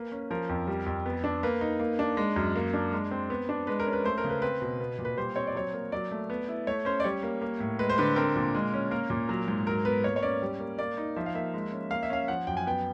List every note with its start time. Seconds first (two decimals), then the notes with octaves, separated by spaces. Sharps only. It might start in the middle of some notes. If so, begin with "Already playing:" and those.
Already playing: A#3 B4
0.12 C#4
0.30 F3 A#4
0.49 F2
0.67 G3
0.86 F2
1.06 B3
1.24 D4
1.43 A#3 B4
1.61 D#4
1.80 A#3
1.99 D4
2.17 G#3
2.36 F#2
2.56 A#3
2.74 D4
2.92 G#3
3.11 C4
3.30 B3
3.49 D4
3.67 G#3 B4
3.80 A#4
3.87 C#4
3.93 B4
4.04 A3 C5
4.18 A#4
4.24 C#3
4.29 B4
4.42 C4 B4
4.62 B2
4.80 B3
4.98 A#2
5.05 B4
5.18 G3 C5
5.36 C4 C#5
5.47 D5
5.55 F#3 C#5
5.73 A#3
5.92 F#3 D5
6.11 A3
6.30 B3
6.48 E4
6.67 A3 C#5
6.85 C#4 C5
7.00 D5
7.04 G3 C#5
7.23 A#3
7.42 A#3
7.60 A2
7.79 G#3 B4
7.89 C5
7.98 D3 B4
8.16 C4 A#4
8.36 A#2
8.55 G#3
8.74 C#4
8.91 A#3 A#4
9.10 A#2
9.29 F#3
9.48 G#2
9.67 F#3 A#4
9.85 B3 B4
10.04 A#3 C#5
10.16 C#5
10.22 C#4 D5
10.42 G3
10.60 A#3
10.79 A#3 D5
10.98 D#4
11.16 F3 E5
11.26 F5
11.35 A#3 E5
11.54 G#3
11.72 C#4
11.91 A#3 F5
12.03 E5
12.10 C#4 F5
12.28 F3 F#5
12.47 F#2 G5
12.57 G#5
12.67 B3 G5